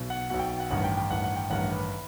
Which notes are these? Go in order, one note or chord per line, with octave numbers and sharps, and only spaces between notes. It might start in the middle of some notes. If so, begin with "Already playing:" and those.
Already playing: B1 B2
F#5
B1 B2 F#5
G5
G5
F#5
A1 G2 D#3 F#5
G5
G5
A1 G2 D#3 F#5
F#5
G5
A1 G2 D#3 F#5
B4